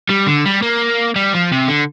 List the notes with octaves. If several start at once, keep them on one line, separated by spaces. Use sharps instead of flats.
G3
D3
G3
A#3
G3
F3
C3
D3